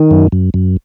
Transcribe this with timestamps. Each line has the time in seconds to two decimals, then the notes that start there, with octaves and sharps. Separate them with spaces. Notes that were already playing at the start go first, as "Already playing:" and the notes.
Already playing: D#3
0.11 F#2
0.32 F#2
0.54 F#2